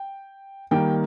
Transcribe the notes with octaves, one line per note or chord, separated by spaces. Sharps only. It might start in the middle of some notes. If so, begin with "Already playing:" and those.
Already playing: G5
D#3 G3 A#3 G5